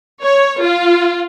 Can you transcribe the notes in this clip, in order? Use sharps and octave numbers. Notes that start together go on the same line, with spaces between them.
C#5
F4